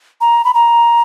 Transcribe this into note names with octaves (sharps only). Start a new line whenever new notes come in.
A#5
B5
A#5